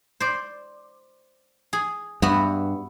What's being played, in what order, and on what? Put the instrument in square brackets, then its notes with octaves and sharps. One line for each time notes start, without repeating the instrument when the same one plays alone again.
[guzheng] C5 D5
G#4
[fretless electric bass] G2 [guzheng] B3 F#4 E5